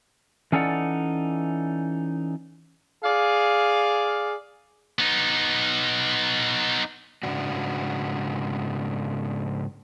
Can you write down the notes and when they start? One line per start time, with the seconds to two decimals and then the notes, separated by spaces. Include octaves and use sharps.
0.52 E3 C#4 D#4 A4 D5 F#5
3.04 G#4 D5 F5
4.99 B3 D#4
7.23 G#2 C#3 D4 F#4